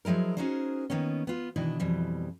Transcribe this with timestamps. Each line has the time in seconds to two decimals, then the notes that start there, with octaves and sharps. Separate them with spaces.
0.05 F3 F#3 G#3 E4 A#4
0.37 C#4 D#4 F#4 G#4 A#4 C5
0.90 D#3 A#3 B3 C#4
1.27 B3 F4
1.56 B2 D#3 E3 D4 E4
1.80 F2 B2 E3 G3